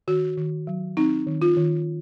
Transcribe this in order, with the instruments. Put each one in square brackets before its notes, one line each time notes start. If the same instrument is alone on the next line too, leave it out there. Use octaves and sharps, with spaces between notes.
[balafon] D#3 F#4
D#3
F#3
C4 D#4
D#3
F4
D#3